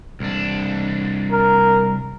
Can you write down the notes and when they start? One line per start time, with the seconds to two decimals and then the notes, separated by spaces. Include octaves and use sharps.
0.20 C2 D4
1.31 A#4